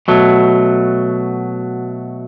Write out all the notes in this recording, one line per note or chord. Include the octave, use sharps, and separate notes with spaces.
B2 F#3 A3